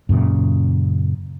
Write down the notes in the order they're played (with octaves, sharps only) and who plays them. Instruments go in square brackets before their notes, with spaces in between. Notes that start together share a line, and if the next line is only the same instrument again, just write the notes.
[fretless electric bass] F#2 A#2 C#3